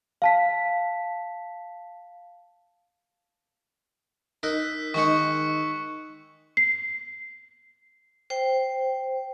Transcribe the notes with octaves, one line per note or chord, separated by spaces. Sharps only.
F5 A5 B6
D#4 A#4 E6 F#6 B6
D#3 G#3 D#4 C#6 C#7
C7
C5 G5